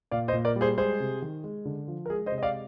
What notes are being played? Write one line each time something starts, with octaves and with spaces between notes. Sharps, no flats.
A#2 D5 F5
C5 D#5
A#2
A#4 D5
G3
G#4 C5
G#3 G#4 C5
C3
D#3
G#3
D3
F3
A#4
G#3 G#4
C5 D#5
C3
D#5
D5 F5